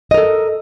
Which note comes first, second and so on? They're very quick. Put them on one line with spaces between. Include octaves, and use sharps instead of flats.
D#5 A#4 A4